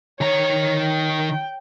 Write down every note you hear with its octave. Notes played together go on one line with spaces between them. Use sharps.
D#3 C#5 A#5
G5